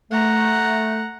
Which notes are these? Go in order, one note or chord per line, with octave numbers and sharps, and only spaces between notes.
A3 F#5 A#5